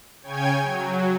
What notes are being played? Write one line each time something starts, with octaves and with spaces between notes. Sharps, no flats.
C#3 C#5 G5 G#5 G#6
F#3